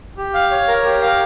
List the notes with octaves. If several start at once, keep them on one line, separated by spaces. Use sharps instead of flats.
G4
F5
C#5
A#4
G4
F5